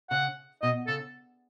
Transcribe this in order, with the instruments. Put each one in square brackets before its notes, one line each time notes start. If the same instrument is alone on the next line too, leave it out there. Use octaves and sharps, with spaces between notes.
[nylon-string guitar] C#3 [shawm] F#5
[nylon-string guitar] B2 [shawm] D#5
[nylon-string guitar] C#3 [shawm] A4